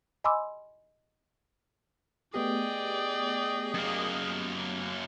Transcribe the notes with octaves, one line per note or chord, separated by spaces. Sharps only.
D#5 G#5 B5 C6 D6 E6
A3 B3 G4 G#4 D5 D#5 G5
F#2 A#3